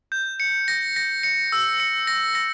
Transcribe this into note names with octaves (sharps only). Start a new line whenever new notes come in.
G6
C#7
A#6
A#6
C#7
E6
C#7
A#6
A#6